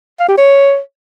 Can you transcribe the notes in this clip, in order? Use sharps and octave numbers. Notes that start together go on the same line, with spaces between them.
F5
G4
C#5